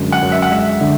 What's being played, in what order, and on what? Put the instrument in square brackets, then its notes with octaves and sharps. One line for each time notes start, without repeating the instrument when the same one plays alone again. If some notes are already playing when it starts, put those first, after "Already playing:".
Already playing: [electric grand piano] F#2 D3 G#3
[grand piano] F#5
[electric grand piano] F#2
[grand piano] E5
F#5
[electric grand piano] G#3 [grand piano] E5
[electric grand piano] D3